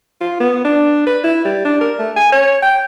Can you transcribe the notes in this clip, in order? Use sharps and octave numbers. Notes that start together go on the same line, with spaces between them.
F4
B3
D4
B4
E4
G3
D4
A#4
A3
G#5
C#5
G5